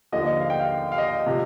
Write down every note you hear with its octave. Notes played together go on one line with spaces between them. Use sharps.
D#2 D3 F3 D#5
D#5
F5
G5
F5
F5
D#5
C3 F3